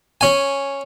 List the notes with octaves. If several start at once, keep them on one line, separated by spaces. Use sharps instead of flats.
C#4 G#5